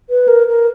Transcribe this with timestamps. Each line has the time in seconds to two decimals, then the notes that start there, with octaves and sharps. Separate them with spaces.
0.10 B4
0.28 A#4
0.48 A#4